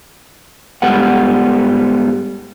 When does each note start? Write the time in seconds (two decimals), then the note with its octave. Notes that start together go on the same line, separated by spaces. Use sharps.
0.82 G#2 G3 B3 F#5